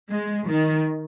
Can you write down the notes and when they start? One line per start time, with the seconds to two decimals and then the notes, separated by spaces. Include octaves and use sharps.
0.11 G#3
0.48 D#3